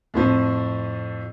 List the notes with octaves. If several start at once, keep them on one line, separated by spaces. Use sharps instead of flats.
F2 A2 F3